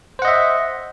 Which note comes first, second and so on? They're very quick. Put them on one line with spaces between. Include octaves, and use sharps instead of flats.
C5 F#5 D#5 E5